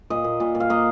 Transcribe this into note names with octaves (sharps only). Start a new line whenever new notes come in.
A#2 D#5
A#2
A#2
A#2
F5
A#3 D#5